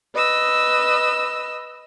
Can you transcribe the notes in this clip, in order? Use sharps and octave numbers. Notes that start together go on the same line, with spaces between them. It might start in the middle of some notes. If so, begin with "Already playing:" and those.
B4 D#5 E6